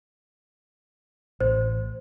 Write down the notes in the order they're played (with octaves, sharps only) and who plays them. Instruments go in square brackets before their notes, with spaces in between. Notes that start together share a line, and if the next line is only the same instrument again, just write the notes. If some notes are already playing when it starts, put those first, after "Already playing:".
[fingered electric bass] A1 [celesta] C5